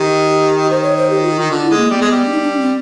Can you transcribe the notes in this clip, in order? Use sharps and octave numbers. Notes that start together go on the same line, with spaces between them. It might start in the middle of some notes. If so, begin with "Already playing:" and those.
Already playing: D#3 G4
G4
D#3 C5
C#5
C5
G4
F4
D#3
D3 F4
E4
G#3
A#3
G3 B3
G#3
G3
D4
D#4
D4
C#4
C4